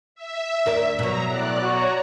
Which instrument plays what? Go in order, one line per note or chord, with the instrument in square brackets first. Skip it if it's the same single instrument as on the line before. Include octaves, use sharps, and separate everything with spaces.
[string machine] E5
[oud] D2 A#4 D5
[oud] B2 F#3 [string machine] A#5
[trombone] A2 [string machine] D5 F#6
[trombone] F#4 [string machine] C#5 A#5